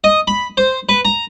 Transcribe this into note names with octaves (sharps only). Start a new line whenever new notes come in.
D#5
B5
C5
B4
A#5